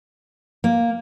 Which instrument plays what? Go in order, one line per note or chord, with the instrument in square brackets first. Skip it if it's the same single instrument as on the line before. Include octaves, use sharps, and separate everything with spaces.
[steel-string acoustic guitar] A#3